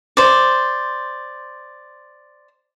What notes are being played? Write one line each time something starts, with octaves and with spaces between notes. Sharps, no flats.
C5 D5